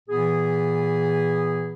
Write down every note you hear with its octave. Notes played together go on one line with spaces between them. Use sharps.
A#2 E3 B3 G#4